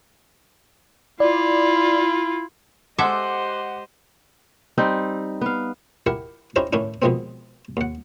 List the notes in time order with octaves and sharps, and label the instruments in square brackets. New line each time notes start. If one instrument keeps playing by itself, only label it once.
[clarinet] E4 [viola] F4 [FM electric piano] D5
[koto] G#3 A4 E5 [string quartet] G4 C5 D#5 [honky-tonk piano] F#5 D6
[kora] G3 C4 D#4
B3 F5
[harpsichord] E4 G4 A#4 F#5
C#4 D#4 E4 G4 C5 A#5
A2 D#3 C#4 D4 E4
B2 D#3 F3 G#3 B3 C4
D#2 F#5